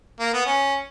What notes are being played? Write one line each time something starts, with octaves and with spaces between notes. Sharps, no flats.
A#3
B3
C#4